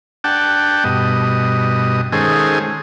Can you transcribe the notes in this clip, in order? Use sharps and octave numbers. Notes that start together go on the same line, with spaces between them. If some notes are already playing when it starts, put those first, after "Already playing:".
D4 F#5 G5 A5
G2 B2 D#5
D#3 G#3 C#4 G#4 A4 C5